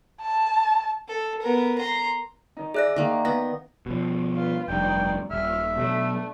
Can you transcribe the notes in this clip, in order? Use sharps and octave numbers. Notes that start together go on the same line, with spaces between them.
A5
A4
B3 A#4
A#5 C6
D#3 D#4
G#4 D5 E5 F#6 A#6
D#3 A#3
B3 A#6
B2 F3
F4 B4
F1 G2 D#4 D5 G5
D#1 E5 F6
B2 F#3 A3 D4